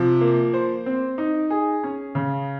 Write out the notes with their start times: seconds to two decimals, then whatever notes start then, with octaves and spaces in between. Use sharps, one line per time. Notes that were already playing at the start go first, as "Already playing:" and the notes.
Already playing: C3 F3
0.21 A#3
0.54 C5
0.86 C4
1.18 D#4
1.50 G#4
1.83 C#4
2.15 C#3